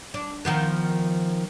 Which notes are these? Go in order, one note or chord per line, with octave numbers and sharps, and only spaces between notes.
D4
D#3 F3 B3